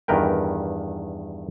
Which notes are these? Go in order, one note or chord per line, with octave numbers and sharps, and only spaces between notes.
E2 G2 D#3 A#4 B4 G5